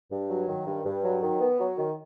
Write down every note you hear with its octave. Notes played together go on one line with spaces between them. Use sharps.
G2
F#3
D#3
G2
G2
F#3
D#3
B3
F#3
D#3